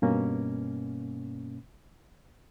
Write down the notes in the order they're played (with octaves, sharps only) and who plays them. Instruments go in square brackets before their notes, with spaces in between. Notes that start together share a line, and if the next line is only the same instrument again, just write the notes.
[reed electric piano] G2 B2 A#3 C#4